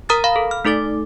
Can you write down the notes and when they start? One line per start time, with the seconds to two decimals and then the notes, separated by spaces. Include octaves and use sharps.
0.09 A#4 A#5 D#6 F6 A6
0.24 F5 B5
0.36 A4
0.51 F6
0.65 A3 D#4 A4 D6 A6